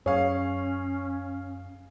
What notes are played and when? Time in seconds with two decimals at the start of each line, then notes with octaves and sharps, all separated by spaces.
0.06 F#2 C#4 G#4 C#5 F5